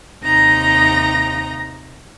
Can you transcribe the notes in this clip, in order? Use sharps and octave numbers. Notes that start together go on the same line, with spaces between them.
D#2 C3 D#4 A#5 A#6